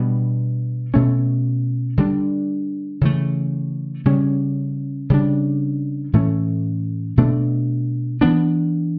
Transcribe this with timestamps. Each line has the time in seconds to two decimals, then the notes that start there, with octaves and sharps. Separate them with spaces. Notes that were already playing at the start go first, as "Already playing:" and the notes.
Already playing: B2 G3 B3 D4
0.94 B2 A3 C#4
1.97 D3 G3 D4
3.01 C#3 E3 A3
4.05 C#3 G3 C#4
5.10 C#3 G3 D4
6.13 A2 E3 A3 C#4
7.17 B2 A3 D4
8.21 E3 B3 D4